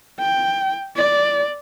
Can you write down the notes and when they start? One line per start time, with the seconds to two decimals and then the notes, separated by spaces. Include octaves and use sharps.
0.20 G5
0.97 D5